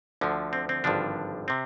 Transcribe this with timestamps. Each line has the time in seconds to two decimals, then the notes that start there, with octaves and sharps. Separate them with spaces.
0.21 D2 D3 F3
0.53 C4
0.69 C4
0.84 G#1 G2 D3 F3 D4
1.48 C3 C4